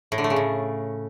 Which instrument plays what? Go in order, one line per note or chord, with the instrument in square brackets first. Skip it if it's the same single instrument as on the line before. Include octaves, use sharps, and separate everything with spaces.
[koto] A2
D3
A3
C#3
A2